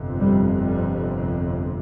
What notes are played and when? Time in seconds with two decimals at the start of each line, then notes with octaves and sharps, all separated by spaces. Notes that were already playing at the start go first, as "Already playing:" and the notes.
Already playing: G1 F2 C3
0.20 G3
0.57 G3